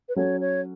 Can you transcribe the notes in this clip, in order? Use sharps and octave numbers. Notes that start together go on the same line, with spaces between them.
B4
F#3 C#4 F#4 A4 C#5
C#5